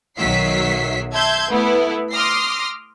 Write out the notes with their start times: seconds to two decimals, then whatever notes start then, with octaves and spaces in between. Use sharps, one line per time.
0.17 B1 D#3 F#3 E5 B6 C7
1.13 E5 A5 C6 G6 G#6
1.49 A3 B3 E4
2.12 C6 D6 D#6 F6 A#6 C7